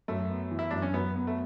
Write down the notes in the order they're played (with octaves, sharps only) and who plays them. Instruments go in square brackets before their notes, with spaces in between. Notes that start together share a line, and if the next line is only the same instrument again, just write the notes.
[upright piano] F#2 [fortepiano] A3
[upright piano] B3
E3
[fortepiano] E4
[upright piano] F#2 [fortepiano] D4
[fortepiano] C#4
[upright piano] F#2 [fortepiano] B3
[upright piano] B3
[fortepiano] A3